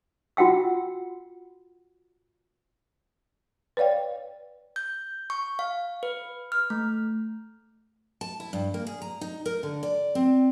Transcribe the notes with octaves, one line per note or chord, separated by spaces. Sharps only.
F4 F#4 F#5 G5 E6
B4 C#5 D5 F5 G5
G6
C#6
F5
B4
F6
A3
A5
E4
G2
A#3
G#4
A#5
D#4
A#4
D3
D5
C4